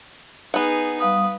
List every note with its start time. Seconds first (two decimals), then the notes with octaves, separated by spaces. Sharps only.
0.54 B3 D#4 G#4 F#5
1.00 G3 B4 F5 D#6